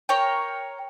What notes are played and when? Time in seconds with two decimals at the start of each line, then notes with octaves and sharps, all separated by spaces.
0.09 A#4 C#5 G5